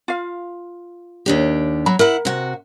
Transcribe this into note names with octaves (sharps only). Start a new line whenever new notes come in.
F4 F5
D#2 D4 G4
F#3 B5
E4 A#4 F#5
C3 F#4